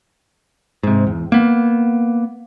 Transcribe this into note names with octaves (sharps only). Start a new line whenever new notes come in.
G#2 C3
E2
A#3 B3